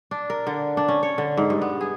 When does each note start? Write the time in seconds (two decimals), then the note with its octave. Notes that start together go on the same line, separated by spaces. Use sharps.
0.11 D4
0.30 A#4
0.47 D3
0.77 D4
0.88 C#4
1.03 C#5
1.18 D3
1.37 G#2
1.50 G2
1.62 B3
1.81 G#4